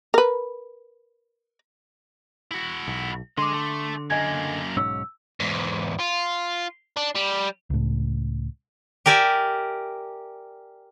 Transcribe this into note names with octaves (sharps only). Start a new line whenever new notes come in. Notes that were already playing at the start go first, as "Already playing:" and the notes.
A#4 B4
E4 F#4
B1
D3 G#4 D#5 C6 D6
A3
F#2 A#3 D#5 G#5 G#6
B1 G#2 C#4 E6
E2 G#2
F4
D4
G3
C#2 A2
G4 A#4 D5 E5 G#5